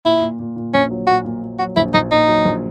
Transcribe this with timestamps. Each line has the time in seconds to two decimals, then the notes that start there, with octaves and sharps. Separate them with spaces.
0.05 A#2 E4
0.22 A#2
0.39 A#2
0.56 A#2
0.74 A#1 C#4
0.90 F#3
1.07 A#2 F#4
1.25 A#2
1.42 A#2
1.59 F#3 F#4
1.76 A#1 E4
1.94 A#1 D#4
2.11 A#2 D#4
2.28 F#3
2.45 A#1